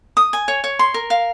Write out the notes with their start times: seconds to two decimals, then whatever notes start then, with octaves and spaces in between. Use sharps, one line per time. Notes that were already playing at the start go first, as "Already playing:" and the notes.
0.17 D#6
0.33 G#5
0.48 C#5
0.64 C#5
0.79 C6
0.94 A#4
1.10 F5